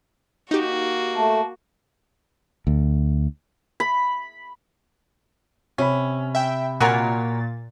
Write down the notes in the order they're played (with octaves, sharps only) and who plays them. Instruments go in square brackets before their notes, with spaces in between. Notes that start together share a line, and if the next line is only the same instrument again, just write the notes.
[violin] A#3 F#4 [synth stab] D#4 G4
[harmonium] A3 [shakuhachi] A5
[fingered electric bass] D2
[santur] B5
[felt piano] C3 B5 [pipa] C#4
[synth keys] E5 G5
[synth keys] A#2 A6 [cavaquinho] F#4 A#4 C#5 [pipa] G#5 A#5